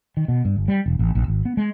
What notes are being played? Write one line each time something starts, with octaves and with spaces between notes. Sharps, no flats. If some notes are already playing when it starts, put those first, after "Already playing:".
D#3
B2
G2
G1
G3
E1
A1
A#1
G#1
B3
G#3